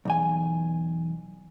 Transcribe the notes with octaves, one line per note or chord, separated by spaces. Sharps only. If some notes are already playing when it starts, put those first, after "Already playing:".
B1 E2 G#5